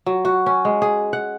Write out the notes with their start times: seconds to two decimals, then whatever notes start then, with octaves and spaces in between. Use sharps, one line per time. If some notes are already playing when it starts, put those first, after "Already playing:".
0.06 F#3
0.25 F#4
0.46 C#4
0.65 G#3
0.82 G#4
1.13 F#5